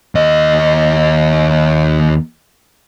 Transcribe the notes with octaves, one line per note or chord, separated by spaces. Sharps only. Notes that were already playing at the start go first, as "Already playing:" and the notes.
D#2 D#5